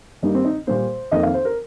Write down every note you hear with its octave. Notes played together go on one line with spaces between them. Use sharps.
G2 G3 A#3 D#4
C4
D#4
A#2 G3 A#3 C5
F2 D#3 A#3 D#5
F5
C5
A#4